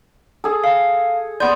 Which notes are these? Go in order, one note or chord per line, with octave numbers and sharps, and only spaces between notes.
G#4 A4
F5
B3 C5 D5 G6